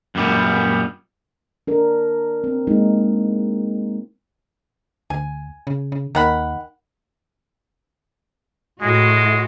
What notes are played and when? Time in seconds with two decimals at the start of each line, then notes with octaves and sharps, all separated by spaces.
0.15 F#2 A#2 G3 B3
1.67 D4 A#4
2.44 C4
2.67 G#3 A#3 D#4 E4
5.10 D2 G#5
5.67 C#3
5.92 C#3
6.15 D#2 D#3 F#5 B5
8.82 A2 G#3 F#4